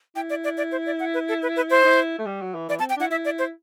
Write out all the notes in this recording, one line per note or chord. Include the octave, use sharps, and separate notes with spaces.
E4 G5
D5
D5
D5
C5
D5
F#5
B4
A4
B4
B4
C5
E4
A3
G3
F#3
E3
E3 D5
C4 A5
G5
D4
E4 F#5
E4 E5
D5
C5